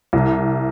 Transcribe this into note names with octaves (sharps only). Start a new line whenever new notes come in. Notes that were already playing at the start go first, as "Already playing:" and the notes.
C2